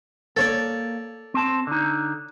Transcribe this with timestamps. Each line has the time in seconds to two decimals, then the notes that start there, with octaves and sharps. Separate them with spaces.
0.36 A#3 A4 C#5 D5
1.34 C4 A5
1.67 D3 D#4